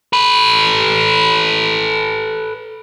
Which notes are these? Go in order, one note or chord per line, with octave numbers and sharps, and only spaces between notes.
A4 B4